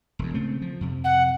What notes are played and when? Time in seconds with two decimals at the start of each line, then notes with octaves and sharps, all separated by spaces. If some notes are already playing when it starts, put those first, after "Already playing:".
0.19 E1 E2
0.34 C#3 A3 C4
0.62 F3
0.81 F2 C3
1.04 F#5